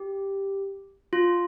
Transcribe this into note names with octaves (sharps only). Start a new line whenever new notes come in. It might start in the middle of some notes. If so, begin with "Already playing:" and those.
Already playing: G4
F4